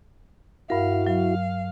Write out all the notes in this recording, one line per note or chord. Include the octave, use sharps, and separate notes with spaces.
G2 E4 F#4 A#4 F5
F#3 F5